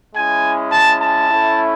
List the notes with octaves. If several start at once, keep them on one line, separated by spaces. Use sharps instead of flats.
G#3 C#4 E4 G#5
A5
A5
A3 C#4 E4